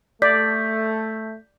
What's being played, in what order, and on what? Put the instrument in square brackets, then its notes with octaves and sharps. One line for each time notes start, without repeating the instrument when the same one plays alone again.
[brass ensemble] A3 [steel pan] D5 [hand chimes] G6 B6